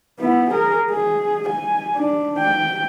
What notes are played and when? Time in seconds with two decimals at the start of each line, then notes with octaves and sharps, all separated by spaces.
0.20 B3 E4
0.50 G#4 A#4
0.90 G#4
1.49 G#5
1.96 D4
2.39 G5